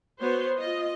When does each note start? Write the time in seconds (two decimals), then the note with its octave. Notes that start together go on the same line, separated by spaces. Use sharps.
0.20 B3 F#4 C5 C#5
0.54 F4 D#5